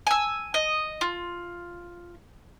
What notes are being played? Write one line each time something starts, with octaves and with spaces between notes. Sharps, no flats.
G#5 E6
D#5
F4